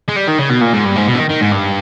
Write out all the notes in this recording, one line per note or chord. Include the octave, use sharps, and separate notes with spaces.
G#3
G3
D#3
C#3
B2
A#2
G#2
G2
G#2
B2
E3
D#3
D#3
G#2
G2